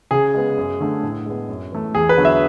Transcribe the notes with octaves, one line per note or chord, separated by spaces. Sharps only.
C#3 G#4
G#3 B3
F#2
D3 A3
A2
G#3 B3
F#2
E3 A3
E2 G#4
B4
D3 F#3 B3
E5